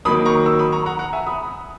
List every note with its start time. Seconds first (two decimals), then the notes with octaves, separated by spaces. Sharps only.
0.05 D#3 F#3 A#3 B5 D#6
0.25 A#5 C#6
0.46 C#6 E6
0.59 B5 D#6
0.72 A#5 C#6
0.86 F#5 A#5
0.99 F#5 A#5
1.13 E5 G#5
1.27 B5 D#6